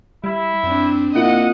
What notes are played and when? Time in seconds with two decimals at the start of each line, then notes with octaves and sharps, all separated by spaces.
0.24 G3 E4
0.64 F#2 C4 D4
1.15 A#2 C4 E4 D#5 F#5